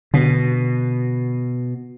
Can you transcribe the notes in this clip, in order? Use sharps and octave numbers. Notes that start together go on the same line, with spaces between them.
B2 D3